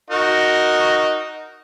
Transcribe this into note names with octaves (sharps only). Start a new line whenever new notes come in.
D#4 F#4 A#4